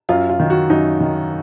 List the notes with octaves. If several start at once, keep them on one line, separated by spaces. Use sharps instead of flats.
F#2 F4
F4
D#3
F#4
F#2 D#4
D#3